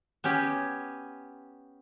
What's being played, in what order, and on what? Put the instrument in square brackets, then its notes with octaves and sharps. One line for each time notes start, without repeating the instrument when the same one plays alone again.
[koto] B3 C#4 G4 G#5